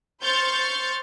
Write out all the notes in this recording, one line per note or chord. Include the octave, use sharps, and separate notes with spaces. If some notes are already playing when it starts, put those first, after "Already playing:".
C5 C#6 F6 G6 A6